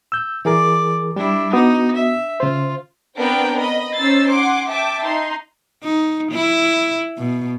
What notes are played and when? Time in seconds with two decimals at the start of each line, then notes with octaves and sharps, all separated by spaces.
0.12 E6 G6
0.45 E3 G#4 A#4 D5
1.16 G3 D4 E4
1.53 B3 D#4 F#4 D#6
1.96 E5
2.40 C#3 F4 C5
3.17 B3 C4 D4 A#4 B4 G5
3.57 D#5 B5
3.97 C#4 D#4 C5 E6 A6 C7
4.29 F#5 G#5 C6 D6
4.69 E5 G5 A5 D6
5.04 D#4 C6
5.84 D#4
6.32 E4
7.18 B2